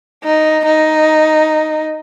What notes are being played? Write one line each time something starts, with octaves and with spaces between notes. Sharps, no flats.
D#4
D#4